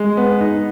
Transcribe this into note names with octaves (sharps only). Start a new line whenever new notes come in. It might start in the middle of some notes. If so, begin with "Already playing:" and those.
Already playing: G#3
B3
D#4